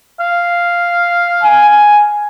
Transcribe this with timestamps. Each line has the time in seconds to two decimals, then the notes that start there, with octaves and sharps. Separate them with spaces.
0.20 F5
1.43 G#5